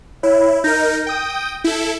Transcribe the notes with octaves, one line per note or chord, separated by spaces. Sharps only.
E4 C#5
D#4 A#4 G6 A#6
G5 D#6
E4 A4